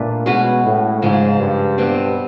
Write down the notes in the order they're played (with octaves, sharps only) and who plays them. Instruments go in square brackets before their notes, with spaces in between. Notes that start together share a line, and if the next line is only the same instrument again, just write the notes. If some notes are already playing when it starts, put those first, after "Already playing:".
Already playing: [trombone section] A#2 [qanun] A3 D4 B4
[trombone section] B2 [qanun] G#3 C#4 F#4 B4
[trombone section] A2
[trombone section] G#2 [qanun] C#3 F3 G#3
[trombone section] G2
[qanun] B2 G3 C4